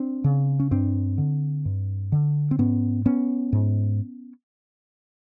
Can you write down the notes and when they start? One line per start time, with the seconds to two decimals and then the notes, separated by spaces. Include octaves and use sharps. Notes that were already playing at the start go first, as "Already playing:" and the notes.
Already playing: C4 D4
0.24 C#3
0.60 C#4
0.71 G2 C4 D4
1.18 D3
1.65 G2
2.12 D3
2.51 C4
2.59 G#2 B3 C#4
3.06 B3 C#4
3.52 G#2